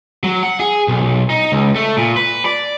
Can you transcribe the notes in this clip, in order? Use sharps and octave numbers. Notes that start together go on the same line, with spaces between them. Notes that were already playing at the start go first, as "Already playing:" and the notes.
F#3
F#5
G#4
B1
B1
D#4
C#2
A3
A#2
B4
D5